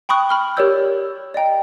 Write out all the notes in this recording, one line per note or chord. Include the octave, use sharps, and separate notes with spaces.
G5 B5 C#6 D#6 F#6
B5 F6 G7
G4 A#4 C#5 D5 E6 G6
D5 D#5 G5 A#5